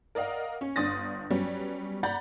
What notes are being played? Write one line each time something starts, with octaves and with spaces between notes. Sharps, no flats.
A#4 D5 D#5 F5 F#5
C#4
G1 D4 C6 D#6 A6 A#6
F#3 G3 B3 C#4
D5 F#5 A#5 B5 G6 A6